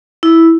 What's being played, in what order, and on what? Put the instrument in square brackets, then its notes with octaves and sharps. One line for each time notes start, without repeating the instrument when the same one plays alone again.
[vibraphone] E4